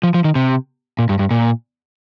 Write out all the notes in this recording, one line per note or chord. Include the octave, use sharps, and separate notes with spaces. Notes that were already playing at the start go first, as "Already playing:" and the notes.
F3
F3
D#3
C3
A#2
G2
G2
A#2